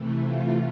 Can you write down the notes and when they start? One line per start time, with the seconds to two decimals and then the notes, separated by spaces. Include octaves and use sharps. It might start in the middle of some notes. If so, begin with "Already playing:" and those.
Already playing: C3 E3 A3
0.22 F4